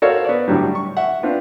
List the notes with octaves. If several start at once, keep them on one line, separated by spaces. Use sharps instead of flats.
F#4 A4 A#4 C5 C#5 F5
B3 D5
A2 D3 F#3 G3
C#6
E5 F#5
C4 D4 F4 B4